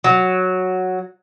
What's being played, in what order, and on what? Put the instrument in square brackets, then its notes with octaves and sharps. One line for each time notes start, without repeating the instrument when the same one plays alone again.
[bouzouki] F#3